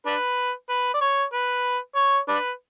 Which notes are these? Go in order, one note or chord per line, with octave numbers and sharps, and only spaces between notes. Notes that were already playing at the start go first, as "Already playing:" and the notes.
D4 B4
B4
D5
C#5
B4
C#5
D4 B4